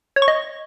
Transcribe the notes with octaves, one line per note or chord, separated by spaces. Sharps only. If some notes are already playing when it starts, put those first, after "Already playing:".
C#5
C#6
D#5